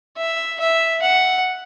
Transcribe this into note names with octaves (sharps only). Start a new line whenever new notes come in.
E5
E5
F#5